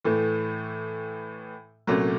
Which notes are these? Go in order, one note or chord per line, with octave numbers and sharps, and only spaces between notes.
A2 E3 A3
C2 A#2 F#3 A3 C#4